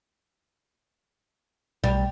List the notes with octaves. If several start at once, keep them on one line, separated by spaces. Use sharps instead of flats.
B1 G3